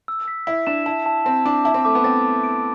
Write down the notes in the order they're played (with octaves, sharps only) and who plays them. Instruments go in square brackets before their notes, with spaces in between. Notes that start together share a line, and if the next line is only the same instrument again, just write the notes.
[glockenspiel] E6
B6
[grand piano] E4 [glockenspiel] B6
[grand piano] D4 [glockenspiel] E7
[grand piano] E4 [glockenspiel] A5
[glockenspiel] A5
[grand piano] C4 [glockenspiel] A5
[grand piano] D4 [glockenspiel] D6
[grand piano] E4 [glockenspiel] A5
[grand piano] C4
[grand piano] A3 [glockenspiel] D6
[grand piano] B3
[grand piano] C4 [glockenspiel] A6
[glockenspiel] A5
D7